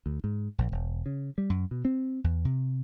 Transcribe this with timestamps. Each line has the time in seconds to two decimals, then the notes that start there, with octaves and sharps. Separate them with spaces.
0.06 D2
0.24 G#2
0.58 A#1
0.72 E1
1.06 C#3
1.38 G3
1.50 F#2
1.71 B2
1.85 C4
2.24 E2
2.45 C3